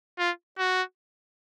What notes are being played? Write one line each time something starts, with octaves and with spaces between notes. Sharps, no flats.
F4
F#4